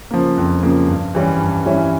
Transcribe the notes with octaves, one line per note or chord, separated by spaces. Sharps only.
C#3 F3 A#3
F2
C#3 F3 A#3
G2
E3 G3 C#4 E4
G2
E3 G3 C#4 E4